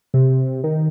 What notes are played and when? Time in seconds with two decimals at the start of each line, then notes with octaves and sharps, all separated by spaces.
0.14 C3
0.64 D#3